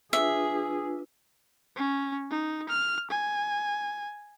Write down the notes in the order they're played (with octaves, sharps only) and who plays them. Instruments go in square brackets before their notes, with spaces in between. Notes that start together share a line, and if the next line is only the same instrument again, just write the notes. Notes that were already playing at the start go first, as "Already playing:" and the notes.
[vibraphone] D4 F4 B4 [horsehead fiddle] G#4 [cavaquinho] E5
[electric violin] C#4
D#4
F6
G#5